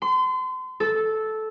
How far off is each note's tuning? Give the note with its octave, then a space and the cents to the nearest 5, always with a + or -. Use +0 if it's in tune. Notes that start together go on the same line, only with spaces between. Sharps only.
C6 -35
A4 -10